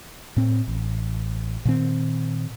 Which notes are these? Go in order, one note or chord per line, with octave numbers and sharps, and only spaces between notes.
A2 C4
A1
A#2 D#3 C4